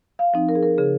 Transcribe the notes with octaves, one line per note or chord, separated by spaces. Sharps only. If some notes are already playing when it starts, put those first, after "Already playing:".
F5
F3 C4 D#4
A#4
G#4
A#4
C#3 G#4